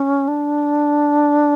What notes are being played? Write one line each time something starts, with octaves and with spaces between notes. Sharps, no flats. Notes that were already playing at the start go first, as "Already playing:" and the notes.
Already playing: C#4
D4